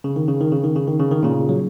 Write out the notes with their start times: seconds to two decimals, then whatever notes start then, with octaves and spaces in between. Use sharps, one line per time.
0.04 C#3
0.16 D#3
0.28 C#3
0.41 D#3
0.52 C#3
0.64 D#3
0.76 C#3
0.88 D#3
1.00 C#3
1.11 D#3
1.23 A#2 C#3
1.49 F#3